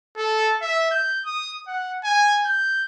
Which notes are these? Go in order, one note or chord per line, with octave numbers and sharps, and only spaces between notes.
A4
E5
G6
D#6
F#5
G#5
G6